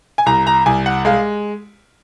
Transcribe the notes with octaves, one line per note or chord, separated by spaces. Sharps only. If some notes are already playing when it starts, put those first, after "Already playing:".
G#5
C2 A#5
A#5
C2 G#5
F#5
G#3 F5